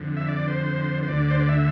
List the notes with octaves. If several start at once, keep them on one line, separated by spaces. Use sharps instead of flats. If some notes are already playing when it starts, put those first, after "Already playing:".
Already playing: F2 D3
E5
D5
C5
C5
D2 D3 D5
C5
D5
E5